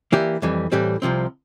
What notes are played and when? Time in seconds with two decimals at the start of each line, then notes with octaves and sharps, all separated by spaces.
0.12 E3 A#3 E4 G4 D5
0.42 F2 E3 G3
0.72 A2 E3 G3 C4 G4
1.02 C2 C3 F3 C4